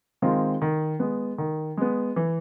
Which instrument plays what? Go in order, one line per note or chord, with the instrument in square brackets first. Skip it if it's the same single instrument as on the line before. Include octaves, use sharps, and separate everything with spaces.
[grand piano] D#3 G#3 C4 F4
D#3
G#3 B3
D#3
G#3 B3
E3